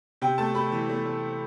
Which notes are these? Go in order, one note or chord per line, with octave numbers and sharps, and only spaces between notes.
C3 G5
A3 A5
A3 B5
E3
A3
A3